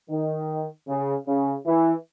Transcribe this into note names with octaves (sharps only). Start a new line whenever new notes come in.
D#3
C#3
C#3
E3